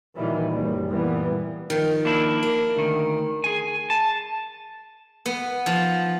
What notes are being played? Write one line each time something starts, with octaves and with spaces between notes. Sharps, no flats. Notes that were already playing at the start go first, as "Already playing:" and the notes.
A#2 D#3 E3 F#3 G3
F#1 C2 G3
A#2 E3 G3 B3
D#3 F3
A#3 D4 E4
A#4
D2 D#3
G#4 G#5
A5
B3
F3